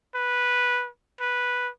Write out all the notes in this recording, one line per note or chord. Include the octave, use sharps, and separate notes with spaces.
B4
B4